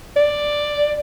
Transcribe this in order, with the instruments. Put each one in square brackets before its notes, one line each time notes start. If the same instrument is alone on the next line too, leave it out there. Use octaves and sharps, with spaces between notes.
[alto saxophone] D5